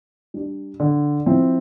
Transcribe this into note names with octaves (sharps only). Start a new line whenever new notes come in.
G3 D4
D3
F3 C4 E4